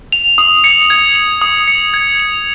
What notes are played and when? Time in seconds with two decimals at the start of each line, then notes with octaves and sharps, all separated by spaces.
0.12 F7
0.38 D#6
0.64 C#7
0.90 G#6
1.15 F7
1.42 D#6
1.68 C#7
1.94 G#6
2.20 F7